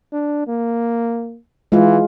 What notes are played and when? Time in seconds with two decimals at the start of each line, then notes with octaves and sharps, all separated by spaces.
0.13 D4
0.48 A#3
1.72 E3 G#3 F4